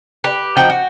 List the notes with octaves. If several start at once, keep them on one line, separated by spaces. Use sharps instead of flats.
G4 B4
F3 D#4 F#4 G5
F#4